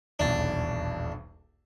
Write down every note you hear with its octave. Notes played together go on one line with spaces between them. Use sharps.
D#1 B1 E2 D4